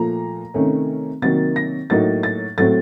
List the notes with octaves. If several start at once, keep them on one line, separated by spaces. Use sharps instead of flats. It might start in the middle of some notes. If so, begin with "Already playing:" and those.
Already playing: A#2 F3 A3 A#5
C3 D#3 A3 C#4
C3 D#3 F#3 A#3 A6
A#6
A2 F#3 A#3 D#4 A6
A6
A2 F#3 A3 C4 A6